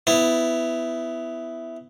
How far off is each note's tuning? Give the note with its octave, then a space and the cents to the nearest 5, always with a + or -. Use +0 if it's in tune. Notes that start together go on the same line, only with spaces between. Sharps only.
B3 +20 E4 +0